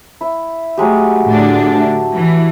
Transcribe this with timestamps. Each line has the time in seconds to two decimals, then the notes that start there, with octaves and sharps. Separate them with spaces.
0.21 E4
0.78 F#3 G#3 A3 G4
1.26 A2 D3 D4
1.74 E5 A5
2.15 E3